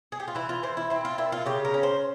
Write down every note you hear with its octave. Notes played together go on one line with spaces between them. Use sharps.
G#4
G4
F4
E3 E4
F4
E3 C5
E4
C4 E4
F4
A#2 E4
F4
C#3 G4
A#4
C#4
C5